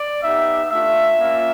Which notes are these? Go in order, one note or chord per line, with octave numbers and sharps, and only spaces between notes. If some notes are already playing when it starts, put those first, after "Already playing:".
Already playing: D5
B3 D#4 G4 E5
A3 D4 F4 E5
A#3 C#4 F4